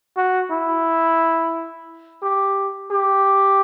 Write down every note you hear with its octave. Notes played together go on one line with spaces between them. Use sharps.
F#4
E4
G4
G4